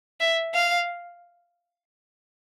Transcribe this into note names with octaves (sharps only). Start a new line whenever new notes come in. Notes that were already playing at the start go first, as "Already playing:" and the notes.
E5
F5